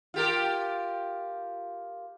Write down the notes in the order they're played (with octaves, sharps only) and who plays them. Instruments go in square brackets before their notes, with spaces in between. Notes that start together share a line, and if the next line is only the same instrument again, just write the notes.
[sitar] F4 G4 A#4